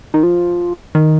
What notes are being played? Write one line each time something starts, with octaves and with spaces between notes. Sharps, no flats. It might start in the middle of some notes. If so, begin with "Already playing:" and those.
D#3
F3
D#3